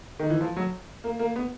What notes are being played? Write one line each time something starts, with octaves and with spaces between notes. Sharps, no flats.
D#3
E3
F3
F#3
A#3
A#3
B3